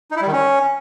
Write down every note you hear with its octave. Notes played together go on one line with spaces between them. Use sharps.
D#4
E4
G3
D#3
C#4